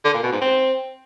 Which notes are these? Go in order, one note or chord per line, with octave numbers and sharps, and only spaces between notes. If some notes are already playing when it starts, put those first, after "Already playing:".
D3
A#2
B2
G#2
C4